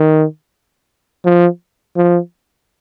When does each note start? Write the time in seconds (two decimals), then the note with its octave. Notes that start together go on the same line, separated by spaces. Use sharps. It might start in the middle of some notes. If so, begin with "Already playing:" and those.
Already playing: D#3
1.25 F3
1.97 F3